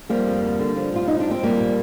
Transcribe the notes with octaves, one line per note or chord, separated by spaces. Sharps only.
F3 G3 A#3
F2
D3
D3
F3
A#2 F4
F3 D#4
D4
A#2 C4
F3 G3 A#3
A#2